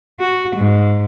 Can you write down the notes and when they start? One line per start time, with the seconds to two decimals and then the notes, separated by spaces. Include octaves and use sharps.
0.21 F#4
0.57 G#2